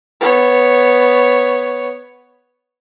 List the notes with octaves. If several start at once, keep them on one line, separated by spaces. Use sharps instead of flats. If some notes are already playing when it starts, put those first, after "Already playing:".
B3 C#5